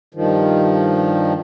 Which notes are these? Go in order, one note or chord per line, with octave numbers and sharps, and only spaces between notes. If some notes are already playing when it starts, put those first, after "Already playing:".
G2 D#3 F3